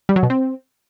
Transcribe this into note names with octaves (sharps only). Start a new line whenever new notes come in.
G3
F#3
B2
C4